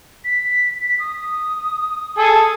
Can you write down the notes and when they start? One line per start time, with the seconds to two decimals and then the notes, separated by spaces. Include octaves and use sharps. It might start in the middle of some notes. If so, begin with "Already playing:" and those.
0.24 B6
0.99 D#6
2.18 G#4 A4